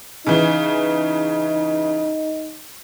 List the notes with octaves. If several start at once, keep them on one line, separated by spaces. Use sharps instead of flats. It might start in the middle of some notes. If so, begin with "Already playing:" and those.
C#3 E3 D#4